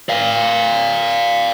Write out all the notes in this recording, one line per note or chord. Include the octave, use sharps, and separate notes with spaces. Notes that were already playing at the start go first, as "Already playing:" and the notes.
D5 F5